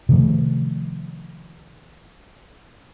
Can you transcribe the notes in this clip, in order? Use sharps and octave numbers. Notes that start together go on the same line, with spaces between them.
C3 D#3 F3 A3